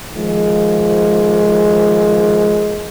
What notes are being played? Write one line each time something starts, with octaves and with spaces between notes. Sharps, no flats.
D#3 F3 G#3